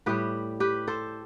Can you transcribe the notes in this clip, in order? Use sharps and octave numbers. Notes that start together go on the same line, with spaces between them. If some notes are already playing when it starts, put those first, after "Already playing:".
A2 G3 G4 B4
G4 B4
A4 C5